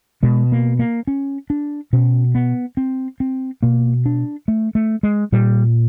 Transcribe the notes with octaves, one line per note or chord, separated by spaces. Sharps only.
B2 G#3
A#3
A#3
C#4
D4
B2 C#4
B3
C4
C4
B2 A#3
D4
A3
A3
G#3
A#2 G3